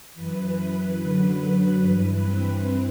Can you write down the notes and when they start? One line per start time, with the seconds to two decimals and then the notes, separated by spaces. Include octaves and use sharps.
0.14 F#2 E3 B4
0.98 F#2 D3 F#3
1.79 G2 E3 B4
2.21 C4